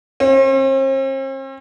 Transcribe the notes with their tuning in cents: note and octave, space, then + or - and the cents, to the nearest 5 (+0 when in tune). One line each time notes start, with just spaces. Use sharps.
C4 +45